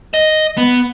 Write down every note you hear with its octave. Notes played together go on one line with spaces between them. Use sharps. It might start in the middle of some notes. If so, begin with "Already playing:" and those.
D#5
B3